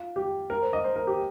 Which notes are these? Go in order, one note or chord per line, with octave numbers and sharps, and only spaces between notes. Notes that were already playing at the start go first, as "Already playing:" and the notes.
Already playing: F4
G4
A#4
C5
D#5
C5
A#4
G4